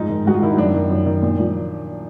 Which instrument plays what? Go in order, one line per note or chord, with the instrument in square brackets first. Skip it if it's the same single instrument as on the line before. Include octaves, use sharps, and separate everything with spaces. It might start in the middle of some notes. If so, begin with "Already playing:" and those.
Already playing: [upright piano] G#2 F3 D#4
D#3
G#2 F#4
F4
D#3 E4
D#4
F#2 D4
D#3
F#2
D#3
A#2
F3